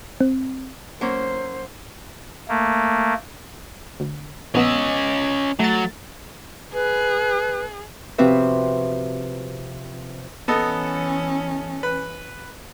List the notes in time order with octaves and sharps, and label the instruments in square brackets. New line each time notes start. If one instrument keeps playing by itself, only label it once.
[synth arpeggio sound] C4
[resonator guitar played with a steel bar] F#3 A#3 C#4 [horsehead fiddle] C5
[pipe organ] A3 A#3
[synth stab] D2
[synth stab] A#1 B3 E6 [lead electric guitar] C#4 D#5
[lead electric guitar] F#3 [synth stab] A3 A6
[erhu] G#4 [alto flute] B4
[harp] C3 F3 C4 F#4 B4 E5
[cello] E3 C#4 [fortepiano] B3 A4 D#5
[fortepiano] B4